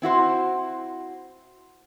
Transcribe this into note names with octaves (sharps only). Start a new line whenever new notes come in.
C4 E4 F#4 C5